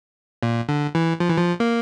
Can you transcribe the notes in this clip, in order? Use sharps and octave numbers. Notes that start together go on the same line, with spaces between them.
A#2
D3
E3
F3
E3
F3
A#3